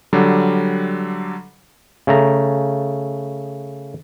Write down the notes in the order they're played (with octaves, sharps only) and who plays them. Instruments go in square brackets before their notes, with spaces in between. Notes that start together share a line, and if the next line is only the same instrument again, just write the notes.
[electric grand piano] D3 F#3 G3
[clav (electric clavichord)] C#3 A3 A#5